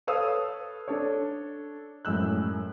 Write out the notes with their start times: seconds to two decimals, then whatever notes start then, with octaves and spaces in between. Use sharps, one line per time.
0.07 A4 B4 C#5 F5 D#6 E6
0.88 D4 A4 C#5
2.05 F#2 A2 G#3 E6 F#6